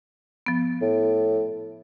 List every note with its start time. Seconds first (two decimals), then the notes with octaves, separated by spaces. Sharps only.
0.46 F3 B3
0.82 A2